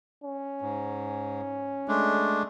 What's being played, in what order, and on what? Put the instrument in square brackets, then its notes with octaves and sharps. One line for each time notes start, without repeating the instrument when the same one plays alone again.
[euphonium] C#4
[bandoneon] G#2
G#3 A3 D4